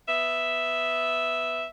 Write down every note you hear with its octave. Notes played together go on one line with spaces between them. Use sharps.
B3 E5